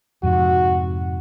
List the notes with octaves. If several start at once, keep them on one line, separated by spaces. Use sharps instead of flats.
F2 G#2 C3 F#4